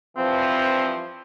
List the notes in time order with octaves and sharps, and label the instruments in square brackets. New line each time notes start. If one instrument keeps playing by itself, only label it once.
[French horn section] G2 E3 F3 [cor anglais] C4